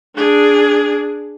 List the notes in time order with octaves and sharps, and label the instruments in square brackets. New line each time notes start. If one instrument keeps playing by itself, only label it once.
[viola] D4 G#4